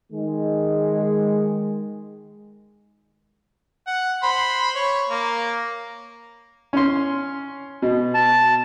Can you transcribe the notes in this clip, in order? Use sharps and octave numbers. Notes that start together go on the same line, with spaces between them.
D#3 G#3
F#5
C5 B5 C6
C#5
A#3
C#4 C6
B2
A5